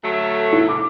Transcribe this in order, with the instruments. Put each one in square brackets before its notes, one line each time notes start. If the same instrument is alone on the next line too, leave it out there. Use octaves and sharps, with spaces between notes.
[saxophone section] D2 F#3 A3
[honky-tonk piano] E4
D6